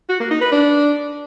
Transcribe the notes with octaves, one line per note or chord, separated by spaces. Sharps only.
F#4
A#3
D#4
B4
D4